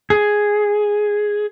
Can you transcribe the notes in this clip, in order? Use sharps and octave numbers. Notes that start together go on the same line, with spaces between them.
G#4